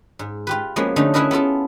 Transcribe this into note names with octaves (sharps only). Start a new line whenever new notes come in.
G#2
F4 G4 B4
F3 G#3 A#3 B3 C#4 F#4
D3 A3 C#4 D#4
C#4 E4 G#4 A#4 B4 D#5
B3 E4 F4 A4